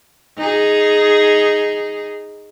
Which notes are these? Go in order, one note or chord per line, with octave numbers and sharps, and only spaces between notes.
D#4 G#4